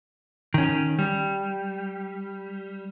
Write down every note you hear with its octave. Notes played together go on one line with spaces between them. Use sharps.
D#3 C#4
G3